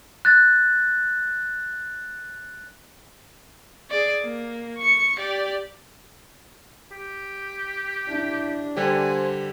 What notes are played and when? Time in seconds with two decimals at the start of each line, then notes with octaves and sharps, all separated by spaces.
0.25 F#6 A6
3.91 G#4 D5
4.22 A#3
4.78 C#6 C#7
5.19 G4 D5
6.92 G4
8.09 D4 E4
8.76 D3 G3 G4 C5 G#5